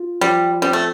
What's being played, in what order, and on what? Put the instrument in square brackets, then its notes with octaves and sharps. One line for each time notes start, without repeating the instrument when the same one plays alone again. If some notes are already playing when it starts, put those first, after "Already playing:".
Already playing: [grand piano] F4
[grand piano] F3 [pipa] G3
[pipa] G3 [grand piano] C4
[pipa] A3